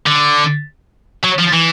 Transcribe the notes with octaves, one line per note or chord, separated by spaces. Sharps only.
D3
F#3
F3
E3